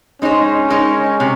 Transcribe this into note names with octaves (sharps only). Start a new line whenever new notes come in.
G#3 C#4 D#4 G#4 C5
G#3 D#4 A#4
C3